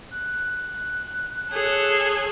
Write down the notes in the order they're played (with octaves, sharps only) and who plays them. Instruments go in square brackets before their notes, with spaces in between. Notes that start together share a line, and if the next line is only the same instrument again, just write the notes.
[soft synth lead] F#6
[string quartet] G#4 A4 C#5